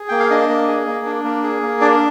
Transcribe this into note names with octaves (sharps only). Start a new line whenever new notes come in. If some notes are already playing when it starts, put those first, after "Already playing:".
Already playing: G#4
A#3 G5
F5
D4 D#5
A#3
G#4
A#3
D4
A#3
G#4
A#3
D4 D5